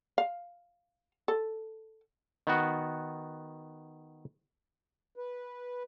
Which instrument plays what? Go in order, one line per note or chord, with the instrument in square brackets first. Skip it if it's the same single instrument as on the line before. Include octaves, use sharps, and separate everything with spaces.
[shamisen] F5
A4
[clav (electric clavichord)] D#3 B3 F#4
[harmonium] B4